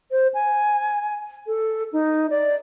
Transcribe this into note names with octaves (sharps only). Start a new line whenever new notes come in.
C5
G#5
A4
D#4
D5